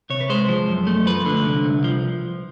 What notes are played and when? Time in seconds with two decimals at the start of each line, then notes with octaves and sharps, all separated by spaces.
0.10 C3 C#5
0.21 B4
0.30 G#3 C5
0.49 F3
0.68 F#2
0.87 A3
1.06 F3 B4
1.26 D3
1.45 C2
1.65 C2
1.84 F3